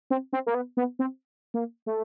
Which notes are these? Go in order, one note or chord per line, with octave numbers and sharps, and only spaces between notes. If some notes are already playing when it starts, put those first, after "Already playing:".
C4
C4
A#3
B3
B3
C4
A#3
A3